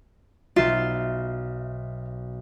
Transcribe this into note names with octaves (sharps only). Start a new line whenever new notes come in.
B1 F4 E5 C7